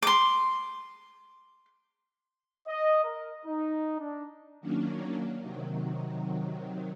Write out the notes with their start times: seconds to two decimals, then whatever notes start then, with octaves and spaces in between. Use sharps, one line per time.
0.02 C6 D6
2.68 D#5
3.04 A#4
3.46 D#4
4.00 D4
4.61 D#3 F#3 A#3 C#4 D4
5.40 C3 D#3 F#3